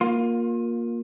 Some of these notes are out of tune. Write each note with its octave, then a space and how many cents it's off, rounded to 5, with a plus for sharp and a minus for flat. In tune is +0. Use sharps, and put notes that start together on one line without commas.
A#3 +10 F4 +30 C6 +0